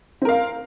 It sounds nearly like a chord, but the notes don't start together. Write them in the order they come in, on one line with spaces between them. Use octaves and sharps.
C4 A#4 F5